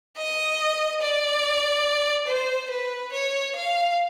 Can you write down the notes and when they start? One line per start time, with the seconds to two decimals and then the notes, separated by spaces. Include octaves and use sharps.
0.17 D#5
1.01 D5
2.28 C5
2.70 B4
3.12 C#5
3.56 F5